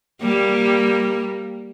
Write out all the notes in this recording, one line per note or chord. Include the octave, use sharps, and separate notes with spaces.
G3 A#3